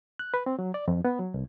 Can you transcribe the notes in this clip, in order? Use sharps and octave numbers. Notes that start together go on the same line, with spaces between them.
F#6
B4
C4
F#3
D5
F2
B3
F#3
C2